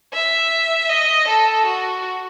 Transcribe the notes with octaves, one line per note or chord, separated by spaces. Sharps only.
E5
D#5
A4
F#4